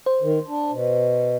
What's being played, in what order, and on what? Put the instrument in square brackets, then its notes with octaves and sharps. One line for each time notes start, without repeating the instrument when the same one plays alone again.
[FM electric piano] C5
[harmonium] D#3
D4
B2